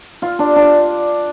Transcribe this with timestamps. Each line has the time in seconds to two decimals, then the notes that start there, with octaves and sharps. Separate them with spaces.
0.22 F4
0.39 D4
0.56 D4